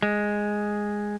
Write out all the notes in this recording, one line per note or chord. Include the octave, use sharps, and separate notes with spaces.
G#3